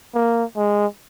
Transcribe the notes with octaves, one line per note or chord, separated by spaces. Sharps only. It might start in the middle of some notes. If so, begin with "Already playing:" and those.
A#3
G#3